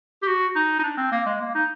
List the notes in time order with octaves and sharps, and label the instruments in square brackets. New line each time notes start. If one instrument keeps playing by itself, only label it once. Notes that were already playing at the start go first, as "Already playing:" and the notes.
[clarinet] G4
F#4
D#4
D#4
D4
C4
A#3
G#3
A#3
D#4